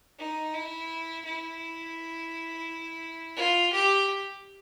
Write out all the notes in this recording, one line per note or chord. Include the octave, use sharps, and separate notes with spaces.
D#4
E4
E4
F4
G4